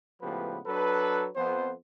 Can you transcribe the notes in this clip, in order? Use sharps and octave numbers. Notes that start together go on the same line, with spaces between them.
C#2 A2 F3 B3 G4 B4
F#3 D4 A4 B4
F2 B3 C5